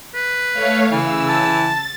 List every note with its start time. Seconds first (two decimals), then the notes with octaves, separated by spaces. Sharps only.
0.15 B4
0.53 A3 C#5 F5
0.91 C#3 E3 E6
1.29 A5
1.62 A6